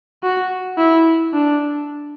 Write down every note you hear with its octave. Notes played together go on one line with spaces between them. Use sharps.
F#4
E4
D4